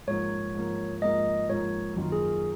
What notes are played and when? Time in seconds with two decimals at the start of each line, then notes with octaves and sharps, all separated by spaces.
0.07 G#2 F3 A#3 C#5
0.55 G#2 F3 A#3
1.02 G#2 F3 A#3 D#5
1.49 G#2 F3 A#3 C#5
1.96 F#2 D#3 A#3 F4
2.12 G#4